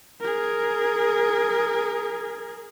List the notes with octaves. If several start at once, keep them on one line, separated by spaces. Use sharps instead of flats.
G#4 A#4